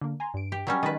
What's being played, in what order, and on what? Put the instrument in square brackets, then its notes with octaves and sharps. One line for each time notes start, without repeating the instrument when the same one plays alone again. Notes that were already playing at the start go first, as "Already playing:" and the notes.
[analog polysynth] D3 A#3
G#5 A#5 C6
G2 D7
[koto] G4
F#3 G3 C#4
[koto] D#3 G#3 B4 [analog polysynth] D#5 A6